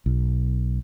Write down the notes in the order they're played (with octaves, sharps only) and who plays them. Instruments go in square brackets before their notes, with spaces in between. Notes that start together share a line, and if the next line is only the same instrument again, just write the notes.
[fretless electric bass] B1